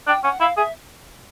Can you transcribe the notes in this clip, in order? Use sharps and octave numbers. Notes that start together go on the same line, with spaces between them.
D4 G5
C#4 F#5
E4 F5
G#4 E5